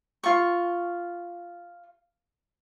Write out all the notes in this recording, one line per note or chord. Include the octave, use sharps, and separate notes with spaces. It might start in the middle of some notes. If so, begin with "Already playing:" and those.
F4 C#6